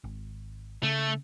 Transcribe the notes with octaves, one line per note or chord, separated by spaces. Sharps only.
G#1
C#3 A3